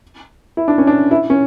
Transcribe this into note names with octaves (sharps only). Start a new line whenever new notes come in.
E4
D4
C#4
D4
E4
C#4